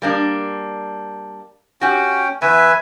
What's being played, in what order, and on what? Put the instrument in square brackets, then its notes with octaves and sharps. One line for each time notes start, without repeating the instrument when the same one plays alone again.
[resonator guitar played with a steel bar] G3 A#3 D4
[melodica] C#4 G5 [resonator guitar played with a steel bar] F#4 G4
[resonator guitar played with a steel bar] E2 [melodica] B4 E5 G#5